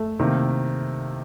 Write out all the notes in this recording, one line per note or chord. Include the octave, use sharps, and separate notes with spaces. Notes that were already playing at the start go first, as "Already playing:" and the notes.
Already playing: A3 A4
C3 D#3 A#3